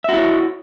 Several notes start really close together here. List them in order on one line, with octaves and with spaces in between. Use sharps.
E5 F#4 E4 C#5